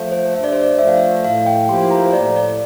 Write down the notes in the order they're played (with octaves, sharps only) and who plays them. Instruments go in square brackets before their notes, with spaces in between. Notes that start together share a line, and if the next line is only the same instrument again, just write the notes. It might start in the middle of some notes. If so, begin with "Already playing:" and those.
Already playing: [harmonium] F3 A3
[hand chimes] C5
[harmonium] G2 [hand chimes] E5
[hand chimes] D5
C5
D5
[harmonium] F3 A3 [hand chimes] E5
[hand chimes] F5
E5
[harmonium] A2 [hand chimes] F5
[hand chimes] G5
[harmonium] F3 A#3 E4 G4 [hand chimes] C6
[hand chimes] A#5
C5
[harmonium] A2 [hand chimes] D5
[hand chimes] D5